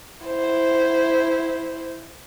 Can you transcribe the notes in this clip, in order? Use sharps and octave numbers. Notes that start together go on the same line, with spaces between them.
E4 C5